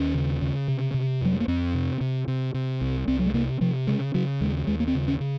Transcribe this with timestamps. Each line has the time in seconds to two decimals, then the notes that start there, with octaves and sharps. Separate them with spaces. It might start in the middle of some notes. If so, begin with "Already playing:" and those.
Already playing: D#2 C#4
0.14 C#3
0.41 C#3
0.68 C3
0.94 C3
1.21 F2 F#3
1.33 G#3
1.40 A#3
1.48 F2 C4
1.74 C3
2.01 C3
2.28 C3
2.54 C3
2.81 C2
3.08 C2 C4
3.19 F#3
3.26 G#3
3.34 C3 A#3
3.61 C3 F3
3.87 C#3 G#3
4.14 C#3 F#3
4.41 D#2 G#3
4.67 D#2 G#3
4.80 A#3
4.88 C4
4.94 C#3
5.08 C#4
5.20 C#3